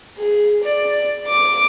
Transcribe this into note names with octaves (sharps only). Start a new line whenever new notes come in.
G#4
D5
D6